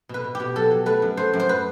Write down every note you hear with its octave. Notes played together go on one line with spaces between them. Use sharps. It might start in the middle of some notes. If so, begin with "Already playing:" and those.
B2 B4
B2
B2 G4
F#3 A4
F#3
A3 B4
F#2
A3 C5
F#2
C5
B4